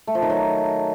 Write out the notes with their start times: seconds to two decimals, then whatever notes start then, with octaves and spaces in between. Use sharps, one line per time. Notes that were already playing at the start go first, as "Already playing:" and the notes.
0.07 A3
0.15 F3
0.22 D#3
0.30 F#3